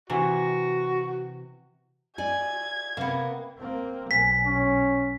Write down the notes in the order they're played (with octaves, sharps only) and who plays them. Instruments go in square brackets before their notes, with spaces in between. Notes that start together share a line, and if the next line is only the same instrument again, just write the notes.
[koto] C3 E3 [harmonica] F#4
[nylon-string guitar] D5 G#5 [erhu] G#6
[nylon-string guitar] C3 [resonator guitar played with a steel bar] A#3 B3
[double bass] A#3 C4
[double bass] B1 [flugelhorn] G#5 [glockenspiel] B6
[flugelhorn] C#4